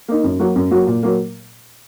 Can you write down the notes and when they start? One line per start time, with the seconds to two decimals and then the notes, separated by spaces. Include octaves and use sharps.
0.08 A#3 D#4
0.24 F#2
0.40 F#3 A#3 F#4
0.56 F#2
0.71 F#3 A#3 F#4
0.87 A#2
1.03 F#3 A#3